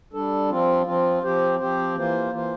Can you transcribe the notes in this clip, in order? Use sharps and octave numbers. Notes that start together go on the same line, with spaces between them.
G3 D4 A4
F3 C4 F4
F3 C4 F4
F3 C4 G4 C5
F3 C4 G4 C5
E3 A#3 F4 C5
E3 A#3 F4 C5